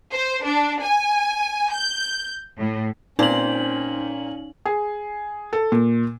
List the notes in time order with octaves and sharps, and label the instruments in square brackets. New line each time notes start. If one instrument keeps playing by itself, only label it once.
[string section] C5
D4
G#5
G6
A2
[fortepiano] A#2 [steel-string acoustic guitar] C4 C5 [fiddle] C#4 [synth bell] D#4 F#7
[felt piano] G#4
A4
A#2